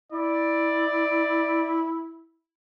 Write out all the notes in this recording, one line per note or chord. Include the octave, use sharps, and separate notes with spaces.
E4 D5